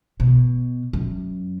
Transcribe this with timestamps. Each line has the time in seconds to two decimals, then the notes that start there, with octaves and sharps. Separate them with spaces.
0.20 B2
0.93 F#2